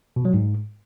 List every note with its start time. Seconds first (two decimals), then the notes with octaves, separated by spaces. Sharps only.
0.16 B2
0.25 F#3
0.34 G#2